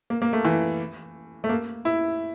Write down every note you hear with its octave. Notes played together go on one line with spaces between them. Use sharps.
A#3
A#3
A3
E3
A3
A#3
E4